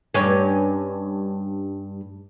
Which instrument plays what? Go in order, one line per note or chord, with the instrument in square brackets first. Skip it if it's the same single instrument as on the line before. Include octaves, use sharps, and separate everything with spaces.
[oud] G2 C#4